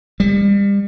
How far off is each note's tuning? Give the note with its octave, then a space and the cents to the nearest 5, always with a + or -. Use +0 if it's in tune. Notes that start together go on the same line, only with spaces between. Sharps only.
G3 +35